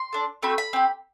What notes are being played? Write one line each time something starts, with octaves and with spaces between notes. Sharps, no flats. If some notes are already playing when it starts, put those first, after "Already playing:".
Already playing: C6
D4 A4
A3 C4 F#4 B5
B5
C4 G4